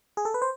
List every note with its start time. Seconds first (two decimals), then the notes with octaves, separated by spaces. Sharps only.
0.17 G#4
0.25 A4
0.34 B4
0.42 C5